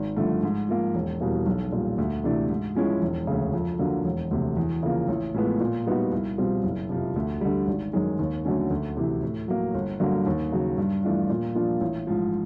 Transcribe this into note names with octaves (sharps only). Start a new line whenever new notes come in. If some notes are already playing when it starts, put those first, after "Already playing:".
Already playing: G#1
G2 D3 F3 A3
G#2
F3 A#3
E1
E2 B2 G3 A#3
B1
A#2 G3
D2
C3 E3 A3 D4
G#2
F3 G#3 C#4 E4
E1
D2 C#3
F2
D3 F#3 A#3
E1
D2 C3
E2
C#3 F3 A#3
A1
A2 F3 G#3 B3
A#2
G3 B3 D#4 F#4
C2
B2 G3 C4 F4
F#1
F2 C3 F3
D2
D3 G3
G#1
F#2 D#3 G#3
D#2
D3 F#3 A3 C#4
D2
C3 E3
A2
F#3 A#3
G1
G2 D3 F#3 A#3
D#2
C#3 F#3
G2
E3 A3 D4 F4
A#2
F3 A#3 D4 F4
A1
G#2 F3